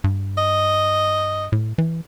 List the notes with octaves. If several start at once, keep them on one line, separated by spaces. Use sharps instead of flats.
G2
D#5
A2
E3